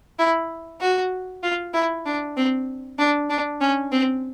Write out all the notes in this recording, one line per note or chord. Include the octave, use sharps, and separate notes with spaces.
E4
F#4
F4
E4
D4
C4
D4
D4
C#4
C4